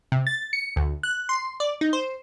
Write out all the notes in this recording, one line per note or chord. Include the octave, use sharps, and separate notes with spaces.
C3
A6
C#7
D2
F#6
C6
D5
D#4
C5